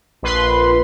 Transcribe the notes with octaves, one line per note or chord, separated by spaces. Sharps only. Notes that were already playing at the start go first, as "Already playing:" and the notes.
A#1 B4 C6